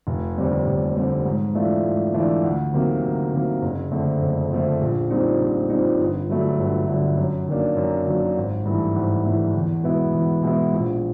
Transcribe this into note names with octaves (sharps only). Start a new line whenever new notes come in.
F1
D#2 D3 G3 C4
F1
D#2 D3 G3 C4
G#2
E3 A3 D4 F4
G#2
E3 A3 D4 F4
D2
C3 D#3 F#3 A#3
D2
C3 D#3 F#3 A#3
F#1
F2 D3 F3 A3
F#1
F2 D3 F3 A3
A#1
A#2 G3 C4 D#4
A#1
A#2 G3 C4 D#4
G1
G2 D3 F#3 A3
G1
G2 D3 F#3 A3
F#2
D#3 F#3 A#3 D4
F#2
D#3 F#3 A#3 D4
G#1
G2 E3 A3
G#1
G2 E3 A3
E2
B2 G#3 B3 E4
E2
B2 G#3 B3 E4
A#1